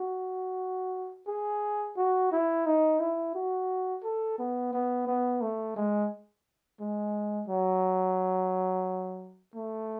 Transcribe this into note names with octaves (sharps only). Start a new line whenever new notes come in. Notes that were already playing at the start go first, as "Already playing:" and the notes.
Already playing: F#4
G#4
F#4
E4
D#4
E4
F#4
A4
B3
B3
B3
A3
G#3
G#3
F#3
A3